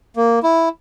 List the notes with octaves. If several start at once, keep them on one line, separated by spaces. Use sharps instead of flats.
A#3
E4